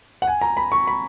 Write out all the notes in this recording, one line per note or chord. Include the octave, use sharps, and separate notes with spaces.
F#5
G#5
A#5
B5
C#6
B5